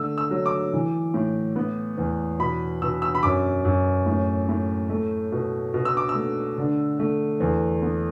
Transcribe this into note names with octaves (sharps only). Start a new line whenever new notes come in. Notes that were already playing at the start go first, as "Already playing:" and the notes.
Already playing: D3 A3 E6
E6
F#3
D6
E3
A2
B3
E2
B2 B5
B2 E6
E6
B5
F#2 D6
F#2
A2
A2
A3
B2
B2
E6
D6
E6
A3
D3
A3
E2
B3